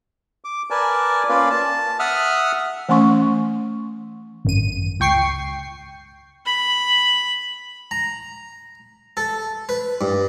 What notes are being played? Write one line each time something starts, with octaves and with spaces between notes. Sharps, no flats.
D6
A#4 B4 D5 G#5 A5
A#3 C#4 F4 B4 D5 F5
A5
E5 F#5 D#6 F6
E3 A3 C#4 C6 C#6
G#1 F#2 D#7
C#2 G5 C#6 C7
B5
A#5
A4
B4
G2